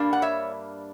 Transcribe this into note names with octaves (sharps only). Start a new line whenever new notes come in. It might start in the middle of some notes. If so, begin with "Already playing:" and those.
Already playing: G2 G3 A#3 D4
F#5
C#5 E5